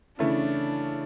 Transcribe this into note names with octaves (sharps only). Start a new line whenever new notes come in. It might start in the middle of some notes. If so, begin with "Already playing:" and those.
C#3 E3 A3 C#4 D4 E4